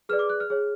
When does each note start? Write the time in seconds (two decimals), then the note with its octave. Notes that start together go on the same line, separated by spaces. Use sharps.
0.09 G#4 B4 D5 F6
0.19 D6
0.29 F#6
0.40 F6
0.50 G#4 C#5